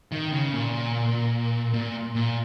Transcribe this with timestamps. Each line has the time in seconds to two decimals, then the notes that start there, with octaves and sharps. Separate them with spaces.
0.12 D#3
0.32 C#3
0.53 A#2
1.74 A#2
2.15 A#2